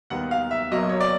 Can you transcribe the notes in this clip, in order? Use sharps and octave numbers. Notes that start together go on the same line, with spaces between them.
D#2 D#3 G3 B3 F#5
F5
E5
B1 B2 F#3 A#3 D#5
C#5
D5